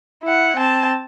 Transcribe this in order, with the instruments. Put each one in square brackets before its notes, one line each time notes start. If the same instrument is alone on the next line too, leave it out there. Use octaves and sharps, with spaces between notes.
[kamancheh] E4 F#5
C4 A5